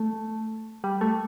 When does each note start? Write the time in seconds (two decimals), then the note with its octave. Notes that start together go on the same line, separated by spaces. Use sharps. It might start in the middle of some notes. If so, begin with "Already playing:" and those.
Already playing: A3
0.84 G3
1.01 A3